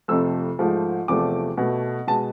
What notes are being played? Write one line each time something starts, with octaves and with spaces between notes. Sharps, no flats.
F2 C3 F3 A3 E6
G#2 F3 A3
E2 C3 F3 A3 D6
B2 A3
B2 G#3 A5